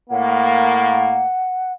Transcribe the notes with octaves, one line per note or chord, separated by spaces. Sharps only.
A2 A#3 F#5